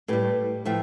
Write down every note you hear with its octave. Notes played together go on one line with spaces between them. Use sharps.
A2 G3 G4 B4
A2 F3 A3 E5 G5